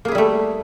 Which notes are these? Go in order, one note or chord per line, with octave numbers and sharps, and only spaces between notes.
G3 A3 A#3 E4 G#4